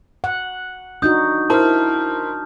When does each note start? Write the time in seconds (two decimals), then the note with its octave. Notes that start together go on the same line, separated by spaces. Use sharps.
0.24 F#5
1.02 D4 D#4 F#4 D#6 G6
1.50 E4 A#4 C5 A5 F6